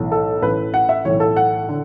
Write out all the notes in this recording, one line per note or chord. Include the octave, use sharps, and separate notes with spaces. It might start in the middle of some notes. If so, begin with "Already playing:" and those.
Already playing: B1 A2 E3
A4
A1 A2 E3 B4
F#5
E5
B1 A2 E3 C#5
A4
F#5
D3